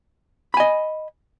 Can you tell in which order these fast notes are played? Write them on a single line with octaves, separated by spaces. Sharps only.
B5 G#5 D#5